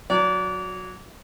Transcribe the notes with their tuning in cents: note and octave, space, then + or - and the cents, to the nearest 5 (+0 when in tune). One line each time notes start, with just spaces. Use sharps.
F#3 -15 D5 -30